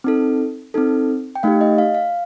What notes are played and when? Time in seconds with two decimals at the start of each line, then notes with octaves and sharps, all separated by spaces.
0.04 C4 D#4 A4
0.74 C4 D#4 A4
1.35 G5
1.43 A3 D#4 G4 F5
1.61 D#5
1.78 F5
1.95 F5